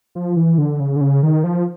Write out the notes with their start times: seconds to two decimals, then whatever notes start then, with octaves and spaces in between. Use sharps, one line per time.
0.15 F3
0.36 E3
0.58 D3
0.80 C#3
0.96 D3
1.01 C#3
1.23 D#3
1.44 F3